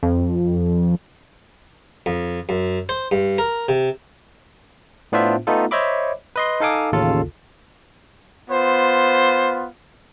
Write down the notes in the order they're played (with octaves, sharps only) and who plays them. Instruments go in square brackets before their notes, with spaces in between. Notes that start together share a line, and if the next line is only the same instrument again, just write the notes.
[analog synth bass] F2
[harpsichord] F2
F#2
C5
G2
A#4
C3
[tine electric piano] A2 B3 D4 F4 C5 E5
A3 B3 D#4 F4 A4
C5 C#5 D#5 E5 B5 D6
B4 D#5 C6
D#4 A4 F5 G#5 D6 D#6
A1 D#2 C#3 F4 A4
[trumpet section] B3 F4 C5